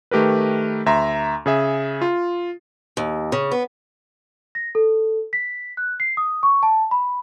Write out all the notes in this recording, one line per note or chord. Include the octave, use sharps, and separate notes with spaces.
D#3 A3 G4 A#4 B4
D2 E5 A#5 C6
C#3 G#4 E5
F4
D#2
C#3
B3
A#6
A4
B6
F#6
C7
D#6
C#6
A5
B5